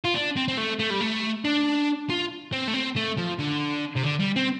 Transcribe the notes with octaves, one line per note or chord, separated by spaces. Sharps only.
F4
D4
C4
C4
A3
A3
G3
A3
D4
F4
C4
A3
C4
A3
F3
D3
C3
D3
G3
C4